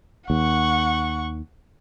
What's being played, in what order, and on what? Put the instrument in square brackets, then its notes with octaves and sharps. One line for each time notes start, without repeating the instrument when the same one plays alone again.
[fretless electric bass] D#2 [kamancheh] F#5 C#6